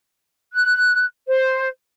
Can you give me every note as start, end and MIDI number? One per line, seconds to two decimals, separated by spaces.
0.52 1.04 90
1.27 1.68 72